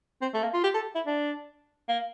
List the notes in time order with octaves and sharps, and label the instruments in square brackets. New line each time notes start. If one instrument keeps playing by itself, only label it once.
[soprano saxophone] C4
A3
A#3
F4
G4
A4
E4
D4
A#3